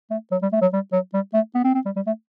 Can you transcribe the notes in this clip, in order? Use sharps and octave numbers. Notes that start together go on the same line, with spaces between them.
A3
F#3
G3
A3
F#3
G3
F#3
G3
A3
B3
C4
C4
G3
G3
A3